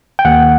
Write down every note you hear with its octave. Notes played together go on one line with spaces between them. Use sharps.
G5
D#2 F#5